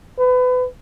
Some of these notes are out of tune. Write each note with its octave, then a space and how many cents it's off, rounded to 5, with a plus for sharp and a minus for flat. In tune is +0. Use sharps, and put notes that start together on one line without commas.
B4 +30